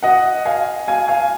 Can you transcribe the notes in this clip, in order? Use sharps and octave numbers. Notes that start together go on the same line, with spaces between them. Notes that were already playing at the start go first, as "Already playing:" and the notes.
D#5 F#5
F5 G#5
F5 G#5
F5 G#5